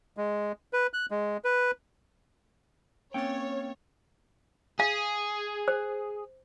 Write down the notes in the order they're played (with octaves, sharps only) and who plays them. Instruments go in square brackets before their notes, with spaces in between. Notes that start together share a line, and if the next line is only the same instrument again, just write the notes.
[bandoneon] G#3
B4
F#6
G#3
B4
[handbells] A#3 C4 A6 [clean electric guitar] C#4 G5 [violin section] C#5
[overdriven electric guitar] G#4 [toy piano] F5
[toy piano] C5